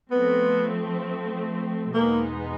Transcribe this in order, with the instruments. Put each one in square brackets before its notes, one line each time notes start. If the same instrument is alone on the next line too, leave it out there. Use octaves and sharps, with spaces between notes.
[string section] F3 A3 C4 [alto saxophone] B3
[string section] E2 B2 G#3 B3 D#4 [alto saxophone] A#3